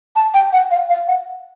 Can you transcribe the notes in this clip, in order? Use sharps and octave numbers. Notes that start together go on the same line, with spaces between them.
A5
G5
F#5
F5
F5
F#5